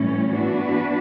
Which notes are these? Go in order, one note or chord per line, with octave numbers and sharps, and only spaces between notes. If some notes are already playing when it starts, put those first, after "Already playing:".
Already playing: A2 E3 G3 C#4
E3 B3 D4 F#4 B4